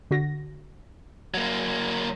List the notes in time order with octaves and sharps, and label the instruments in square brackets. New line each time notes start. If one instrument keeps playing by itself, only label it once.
[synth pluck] D3 F#4 A#6
[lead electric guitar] F#3 A#3